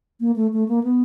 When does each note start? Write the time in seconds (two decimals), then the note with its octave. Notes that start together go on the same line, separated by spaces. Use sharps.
0.20 A#3
0.36 A3
0.53 A3
0.68 A#3
0.84 B3